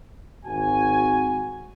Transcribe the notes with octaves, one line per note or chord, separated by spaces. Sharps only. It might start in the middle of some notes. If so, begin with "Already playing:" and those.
G#1 F#4 G#5